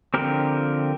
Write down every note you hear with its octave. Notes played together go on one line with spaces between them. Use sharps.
D3 F3 C4 G4 A#4